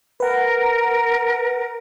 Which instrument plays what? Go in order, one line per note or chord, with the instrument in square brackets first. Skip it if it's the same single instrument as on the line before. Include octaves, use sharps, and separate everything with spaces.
[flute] A#4 [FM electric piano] B4 F#5